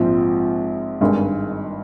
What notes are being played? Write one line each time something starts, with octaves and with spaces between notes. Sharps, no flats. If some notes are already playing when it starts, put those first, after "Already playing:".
Already playing: A#1 G#2 F3 C4
G#1 G2 D#3 G#3